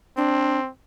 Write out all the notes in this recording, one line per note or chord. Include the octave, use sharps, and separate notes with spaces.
C4 D4